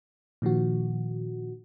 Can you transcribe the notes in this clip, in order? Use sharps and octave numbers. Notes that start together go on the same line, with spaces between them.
A#2 D#3 F3 F#4